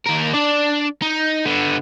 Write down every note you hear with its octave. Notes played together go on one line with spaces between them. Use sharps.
D#2 A#4
D4 D5
D#4
D3 B3